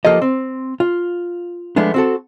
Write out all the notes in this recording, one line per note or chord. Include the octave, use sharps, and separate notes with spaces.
F3 A#3 G4 A4 D#5
C4
F4
F3 G#3 A3 B3 D4
C4 F#4 A4